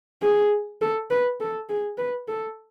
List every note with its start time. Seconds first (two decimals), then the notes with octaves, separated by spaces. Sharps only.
0.23 G#4
0.82 A4
1.10 B4
1.40 A4
1.69 G#4
1.98 B4
2.28 A4